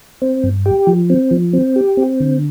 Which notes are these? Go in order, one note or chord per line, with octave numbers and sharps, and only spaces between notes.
C4
G2
G4
F3
C4
F3
C4
G4
C4
D3